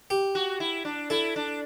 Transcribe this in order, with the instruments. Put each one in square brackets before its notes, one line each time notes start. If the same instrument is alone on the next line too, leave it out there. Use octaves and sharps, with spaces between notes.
[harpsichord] G4
[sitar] F#4
E4
D4
[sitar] E4 [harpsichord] A4
[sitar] D4